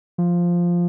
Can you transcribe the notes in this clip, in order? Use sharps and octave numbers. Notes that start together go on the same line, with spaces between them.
F3